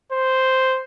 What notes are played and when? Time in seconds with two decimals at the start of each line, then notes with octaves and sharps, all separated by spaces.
0.12 C5